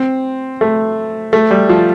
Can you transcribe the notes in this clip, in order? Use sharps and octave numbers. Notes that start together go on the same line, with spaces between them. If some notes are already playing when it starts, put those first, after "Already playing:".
Already playing: C4
A3
A3
G3
F3